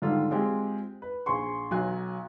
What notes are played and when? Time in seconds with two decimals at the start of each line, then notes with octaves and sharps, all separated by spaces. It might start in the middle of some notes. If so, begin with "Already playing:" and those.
0.02 G#2 D3 D#3 G3 F4
0.31 G#3 C4 F4 G4 G#4
1.02 B4
1.26 A#1 G#4 C6 C#6
1.71 B1 F#3 G#5 F#6